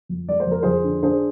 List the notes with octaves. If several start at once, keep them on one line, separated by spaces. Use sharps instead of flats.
F2
G#3 D5
C5
F2 A#4
F2 G#4 C5
D3
D4 G#4 C5